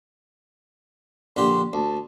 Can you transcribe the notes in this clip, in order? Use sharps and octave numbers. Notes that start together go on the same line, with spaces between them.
A#1 D3 G4 C6
D2 A5